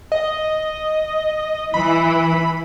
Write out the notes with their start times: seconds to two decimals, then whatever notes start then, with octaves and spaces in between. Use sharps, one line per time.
0.12 D#5
1.74 E3 B5